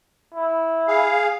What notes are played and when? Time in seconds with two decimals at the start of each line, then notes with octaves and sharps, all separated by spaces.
0.34 E4
0.88 G#4 F5